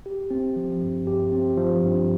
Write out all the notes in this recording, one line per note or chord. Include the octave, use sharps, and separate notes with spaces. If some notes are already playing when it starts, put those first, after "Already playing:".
G4
C4
F3
G2
G4
C4
F3
G2